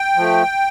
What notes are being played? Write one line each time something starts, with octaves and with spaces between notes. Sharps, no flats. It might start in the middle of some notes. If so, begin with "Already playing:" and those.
Already playing: G5
F3 A3